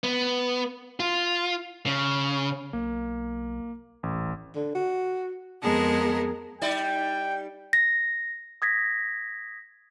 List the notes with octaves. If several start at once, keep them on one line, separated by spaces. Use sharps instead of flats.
B3
F4
C#3
B1 A#3
D#1 A1
D3
F#4
F2 G#3 B3 G#4 A#4 A5
G3 D#4 D5 G5
A#6
D#6 G#6 A#6 B6